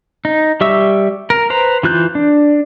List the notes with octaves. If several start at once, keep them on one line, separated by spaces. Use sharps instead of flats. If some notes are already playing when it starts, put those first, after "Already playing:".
D#4
G3 G4 E5 C#6 E6
A#4
B4 C5 A#5
E3 F4 F#6 G6
D4